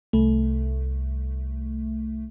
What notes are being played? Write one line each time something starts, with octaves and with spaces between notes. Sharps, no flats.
C2 A3